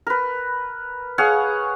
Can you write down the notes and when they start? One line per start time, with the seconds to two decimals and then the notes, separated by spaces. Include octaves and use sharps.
0.07 A#4 B4
1.18 G#4 C#5 F5 F#5